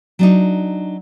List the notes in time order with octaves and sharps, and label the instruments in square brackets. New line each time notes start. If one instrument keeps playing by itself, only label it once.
[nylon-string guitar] F#3 D4 D#4